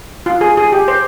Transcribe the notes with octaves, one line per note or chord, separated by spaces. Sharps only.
F4
G#4
G#4
G4
C5